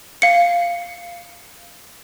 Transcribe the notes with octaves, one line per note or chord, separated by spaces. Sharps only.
F5 C#7